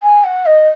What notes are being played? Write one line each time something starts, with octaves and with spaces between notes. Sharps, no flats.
G#5
F#5
D#5